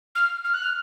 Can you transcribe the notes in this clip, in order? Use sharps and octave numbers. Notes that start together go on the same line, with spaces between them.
F6
F6
F#6
F6